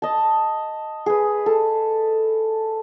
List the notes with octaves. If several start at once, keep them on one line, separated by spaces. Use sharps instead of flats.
D#5 A5
G#4 B4
A4